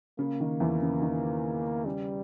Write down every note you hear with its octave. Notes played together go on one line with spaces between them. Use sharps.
C#3 A#3
D#3
E2 E3
C#3
D#3
C#3 G3